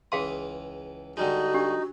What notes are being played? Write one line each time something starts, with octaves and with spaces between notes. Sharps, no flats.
C#2 E3 G#4 F5 C6 D#6
D3 G3 G#3 D#4 F#4
D4 G4